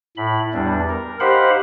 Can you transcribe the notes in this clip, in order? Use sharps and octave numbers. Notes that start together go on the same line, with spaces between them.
A2 B5
E2 G3 D4
A#4
D#4 G4 C5 F5 F#5 B5